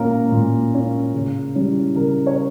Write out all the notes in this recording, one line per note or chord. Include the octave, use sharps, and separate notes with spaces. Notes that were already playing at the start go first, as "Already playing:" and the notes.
Already playing: A#2 A#3 C#4 A#4
A#2
A#3 C#4
C#3
E3 G3 C#4
C#3 A#4
C#5